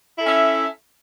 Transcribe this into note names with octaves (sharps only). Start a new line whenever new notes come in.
C#4 E4 A4 E5